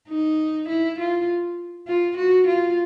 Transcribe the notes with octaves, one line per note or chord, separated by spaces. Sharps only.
D#4
E4
F4
F4
F#4
F4